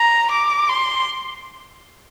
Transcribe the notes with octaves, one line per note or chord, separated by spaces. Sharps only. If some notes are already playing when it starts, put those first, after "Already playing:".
Already playing: A#5
D6
C6